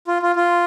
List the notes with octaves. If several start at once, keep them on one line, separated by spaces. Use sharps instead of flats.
F4
F4
F4